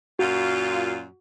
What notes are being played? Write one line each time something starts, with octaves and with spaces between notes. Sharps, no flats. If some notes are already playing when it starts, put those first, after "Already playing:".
F#2 A#2 F4 F#4